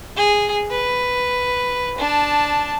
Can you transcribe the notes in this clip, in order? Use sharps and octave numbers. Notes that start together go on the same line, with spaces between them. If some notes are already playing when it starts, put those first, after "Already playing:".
G#4
B4
D4 A5